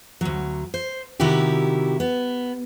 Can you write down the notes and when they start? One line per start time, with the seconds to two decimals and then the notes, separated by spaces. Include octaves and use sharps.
0.21 D2 F#3
0.74 C5
1.20 C3 D#3 E4 F#4 G4
2.00 B3